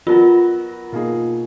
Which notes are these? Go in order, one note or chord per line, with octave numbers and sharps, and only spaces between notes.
F#3 B3 F4 F#4 A#4
B2 A#3 D#4 G#4